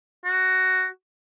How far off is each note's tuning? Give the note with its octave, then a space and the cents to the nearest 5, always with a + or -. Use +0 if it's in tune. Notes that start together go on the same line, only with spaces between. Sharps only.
F#4 +10